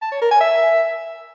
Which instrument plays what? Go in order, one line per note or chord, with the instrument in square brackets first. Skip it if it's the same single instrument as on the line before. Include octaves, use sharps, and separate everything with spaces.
[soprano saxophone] A5
C#5
A#4
G#5
E5